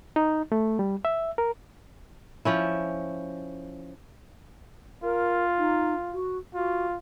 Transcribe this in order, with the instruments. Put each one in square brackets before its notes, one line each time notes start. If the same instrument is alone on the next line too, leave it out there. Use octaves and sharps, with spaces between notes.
[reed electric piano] D#4
A3
G3
E5
A#4
[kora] F3 C#4 E4
[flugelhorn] F4 [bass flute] A#4
[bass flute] D#4
F#4
[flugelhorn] F4 [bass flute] F#4